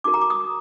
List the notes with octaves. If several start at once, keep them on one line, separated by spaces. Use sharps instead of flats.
D#4 F#4 A#4 D6
A#5
D6
D#6